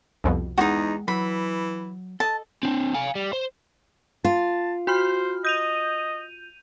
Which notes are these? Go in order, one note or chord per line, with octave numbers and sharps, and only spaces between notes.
C2 F2 B2
E2 G#3 D#4 F#4 F#5 G5
E3 F#3 B5
A4 D#5 A5
C4 D4
F5 G#5
G3
C5
F4 A5
F#4 C5 B5 F6
D#5 G6 D#7 F7